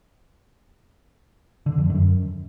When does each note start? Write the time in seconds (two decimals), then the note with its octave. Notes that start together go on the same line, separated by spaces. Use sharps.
1.66 D3
1.78 F2
1.90 F#2